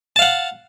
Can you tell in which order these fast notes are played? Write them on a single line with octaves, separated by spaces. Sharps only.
A5 F5 F#5